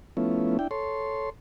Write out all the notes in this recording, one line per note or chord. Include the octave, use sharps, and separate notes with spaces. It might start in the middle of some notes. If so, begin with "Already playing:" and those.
F3 A3 B3 C#4 E4
D4 E4 G5
A4 C#5 C6